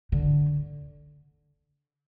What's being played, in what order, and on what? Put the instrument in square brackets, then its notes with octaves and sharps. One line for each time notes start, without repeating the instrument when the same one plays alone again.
[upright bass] D3